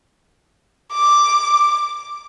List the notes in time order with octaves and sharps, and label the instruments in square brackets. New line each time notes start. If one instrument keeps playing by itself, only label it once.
[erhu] D6